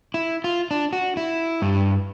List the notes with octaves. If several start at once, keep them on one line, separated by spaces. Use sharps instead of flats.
E4
F4
D4
F#4
E4
G2